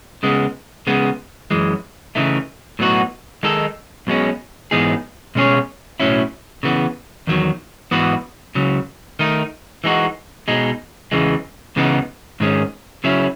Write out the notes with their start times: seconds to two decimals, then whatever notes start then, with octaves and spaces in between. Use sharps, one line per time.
0.23 C#3 G#3 B3
0.87 C#3 G#3 B3
1.51 F#2 E3 G#3
2.15 C#3 E3 A3 D#4
2.79 A2 F#3 B3 D#4 F#4
3.43 D#3 G#3 D#4 A4
4.07 B1 B2 G#3 C#4
4.71 G#2 E3 B3 D#4 G#4
5.35 B2 G#3 C#4 G#4 C#5
6.00 B1 A2 F#3 C#4 E4
6.63 C#3 E3 B3
7.27 E2 D#3 F#3
7.91 G#2 E3 B3 F#4 B4
8.55 C#2 C#3 F#3
9.19 D#3 A3 D#4
9.84 E3 G#3 D#4 F#4
10.48 B2 G#3 D#4
11.12 E2 C#3 E3 G#3
11.76 C#2 C#3 E3 B3 D#4
12.40 G#2 D#3 G#3 C#4
13.04 C#3 F#3 C#4 E4